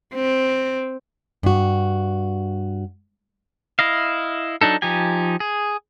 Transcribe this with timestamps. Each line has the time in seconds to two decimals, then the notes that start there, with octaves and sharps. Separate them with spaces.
0.14 C4
1.43 G2 F#4
3.79 E4 D#5 F5
4.61 F#3 D4 D#4 A4
4.82 F3 D#4 G4 G#5
5.40 G#4